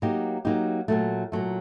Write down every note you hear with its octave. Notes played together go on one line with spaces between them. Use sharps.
F#3 A#3 D#4 G4
F#3 A#3 D#4 G4
A#2 F#3 A3
A#2 F#3 A3